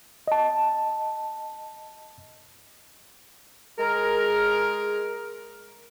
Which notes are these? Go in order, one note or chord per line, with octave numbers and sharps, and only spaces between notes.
D#5 A5
G#3 G#4 A#4